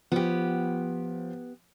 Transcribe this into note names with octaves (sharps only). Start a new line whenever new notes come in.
F3 B3 G4